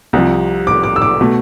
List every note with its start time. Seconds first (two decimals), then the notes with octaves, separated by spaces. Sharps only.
0.13 C2 C3 F3
0.67 D6
0.83 D6
0.96 E6
1.02 D6
1.21 B2 A3